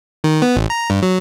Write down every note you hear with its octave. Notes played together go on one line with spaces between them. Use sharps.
D#3
B3
A1
A#5
G2
F#3